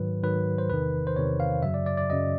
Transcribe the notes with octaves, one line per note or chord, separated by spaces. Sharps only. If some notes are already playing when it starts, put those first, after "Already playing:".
Already playing: G#2 D#3 F#3 B4
G#2 D#3 F#3 B4
C5
E2 C3 D#3 B4
C5
E2 C3 D#3 C#5
F5
F#2 C#3 F#3 E5
D5
D5
D5
F#2 C#3 F#3 D#5